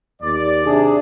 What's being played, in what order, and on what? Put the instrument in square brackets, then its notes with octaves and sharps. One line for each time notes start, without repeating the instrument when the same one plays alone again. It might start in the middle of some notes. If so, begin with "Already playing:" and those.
[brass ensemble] D#2 D5
[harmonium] C3 D4 G#4